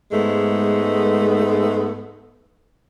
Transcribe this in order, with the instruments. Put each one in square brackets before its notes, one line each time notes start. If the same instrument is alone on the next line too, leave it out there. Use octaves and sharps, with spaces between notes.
[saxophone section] G#2 G#3 A3 B3